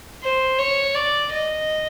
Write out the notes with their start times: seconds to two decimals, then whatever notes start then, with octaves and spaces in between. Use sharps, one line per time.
0.23 C5
0.59 C#5
0.95 D5
1.32 D#5